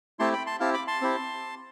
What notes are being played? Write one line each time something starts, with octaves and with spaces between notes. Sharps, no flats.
A3 C4 E4 G4 A5 C6
G5 B5
A5 C6
C4 E4 G4 F5 A5
B5 D6
A5 C6
C4 E4 G4